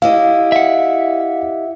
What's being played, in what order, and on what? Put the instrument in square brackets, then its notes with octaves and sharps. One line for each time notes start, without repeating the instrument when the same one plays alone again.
[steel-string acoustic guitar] E4 G4 D#5 [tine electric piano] F5
[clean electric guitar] E5 F#5